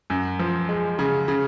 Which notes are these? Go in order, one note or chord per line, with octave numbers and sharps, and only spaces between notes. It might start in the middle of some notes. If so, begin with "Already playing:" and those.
F#2
F3
G#3
C#3
C#3